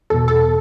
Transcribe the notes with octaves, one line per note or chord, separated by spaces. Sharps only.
E2 B2 A4
A4